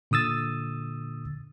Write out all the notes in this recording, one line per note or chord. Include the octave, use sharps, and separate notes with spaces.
A#2 D3 D#6 E6 A6